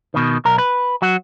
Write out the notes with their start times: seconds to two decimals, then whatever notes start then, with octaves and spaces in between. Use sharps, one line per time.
0.14 B2 D#3
0.45 B1 A#4
0.58 B4
1.02 F#3 F#4